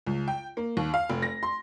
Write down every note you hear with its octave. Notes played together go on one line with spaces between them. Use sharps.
C#2
G5
A#3
D#2
F5
F1
A#6
C6